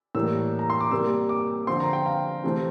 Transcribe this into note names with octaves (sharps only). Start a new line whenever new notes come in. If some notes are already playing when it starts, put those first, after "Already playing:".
A2 E3 G3 A#3 E6
A#5
C6
D6
C3 G3 A#3 E6
D6
D3 F3 C4 C6
A#5
G5
F5
C3 E3 A3 C4